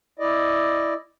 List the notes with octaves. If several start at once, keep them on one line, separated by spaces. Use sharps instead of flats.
E4 D5 D#5